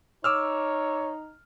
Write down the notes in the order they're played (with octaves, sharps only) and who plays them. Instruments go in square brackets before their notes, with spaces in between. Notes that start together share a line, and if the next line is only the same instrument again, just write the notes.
[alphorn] D#4 [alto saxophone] C#5 [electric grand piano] D6 E6 F6